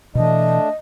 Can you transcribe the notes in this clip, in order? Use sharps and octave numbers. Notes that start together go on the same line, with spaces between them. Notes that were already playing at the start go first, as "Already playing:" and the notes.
B2 E3 A3 D4 D#5